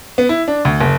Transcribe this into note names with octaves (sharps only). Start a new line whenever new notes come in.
B3
E4
D4
D2
F#1